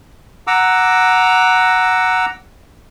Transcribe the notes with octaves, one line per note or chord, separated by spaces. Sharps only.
F#5 A#5 D6 E6